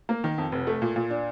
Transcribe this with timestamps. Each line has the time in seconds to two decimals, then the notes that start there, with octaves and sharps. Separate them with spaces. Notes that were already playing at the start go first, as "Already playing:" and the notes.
0.09 A#3
0.24 D#3
0.38 F2
0.52 F1
0.67 A3
0.82 A#2
0.96 A#2
1.10 D4